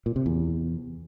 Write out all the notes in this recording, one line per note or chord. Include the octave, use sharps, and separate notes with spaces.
A#2
C3
E2